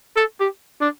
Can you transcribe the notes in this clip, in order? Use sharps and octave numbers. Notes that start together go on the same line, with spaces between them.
A4
G4
D4